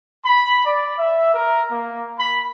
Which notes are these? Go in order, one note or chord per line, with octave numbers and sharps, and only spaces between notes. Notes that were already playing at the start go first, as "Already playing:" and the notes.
B5
D5
E5
A#4
A#3
B5